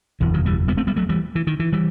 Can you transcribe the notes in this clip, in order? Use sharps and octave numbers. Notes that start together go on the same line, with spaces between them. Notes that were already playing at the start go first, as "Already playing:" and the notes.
F#1 E2 B2 E3
D#3 F#3
E3 G3
G3 B3
A3 C4
G3 B3
F#3 A3
E3 G3
E3
D#3
E3
E3 G3